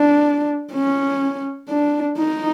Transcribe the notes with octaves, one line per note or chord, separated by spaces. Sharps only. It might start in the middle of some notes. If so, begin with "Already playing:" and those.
Already playing: D4
C#4
D4
D#4